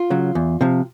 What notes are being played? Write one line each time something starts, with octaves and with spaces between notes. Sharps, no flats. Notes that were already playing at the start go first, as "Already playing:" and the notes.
Already playing: F4
C#3 F#3
E2
C3 F3